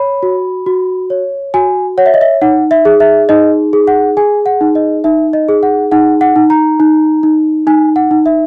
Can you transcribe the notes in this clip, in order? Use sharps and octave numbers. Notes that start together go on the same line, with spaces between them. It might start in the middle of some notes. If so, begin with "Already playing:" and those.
Already playing: C#5 B5
F#4
F#4
C#5
F#4 G#5
C#5 F#5
E5
D#5
E5
D#4 F#5
E5
G#4
E5
D#4 D#5
G#4
F#5
G#4 G#5
F#5
D#4
D#5
D#4 E5
D#5
G#4
F#5
D#4 F#5
F#5
D#4
A#5
D#4
D#4
D#4 G#5
F#5
D#4
E5